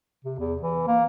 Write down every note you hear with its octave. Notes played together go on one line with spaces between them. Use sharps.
C3
E2
E3
A#3